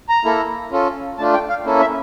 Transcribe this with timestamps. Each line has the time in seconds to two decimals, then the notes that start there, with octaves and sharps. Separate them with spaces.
0.09 A#5
0.25 A#3 E4 A4
0.71 C#4 F4 A4
1.18 A3 D4 F4 A5
1.34 G5
1.49 F5
1.65 A#3 C#4 E4 A4
1.80 E5